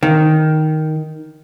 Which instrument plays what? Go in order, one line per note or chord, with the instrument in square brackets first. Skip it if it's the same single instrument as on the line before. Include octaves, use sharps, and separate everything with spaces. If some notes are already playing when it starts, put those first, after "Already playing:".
[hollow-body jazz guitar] D#3